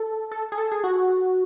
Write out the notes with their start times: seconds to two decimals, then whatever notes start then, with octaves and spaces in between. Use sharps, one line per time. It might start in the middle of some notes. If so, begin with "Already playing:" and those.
Already playing: A4
0.32 A4
0.52 G#4
0.58 A4
0.72 G#4
0.84 F#4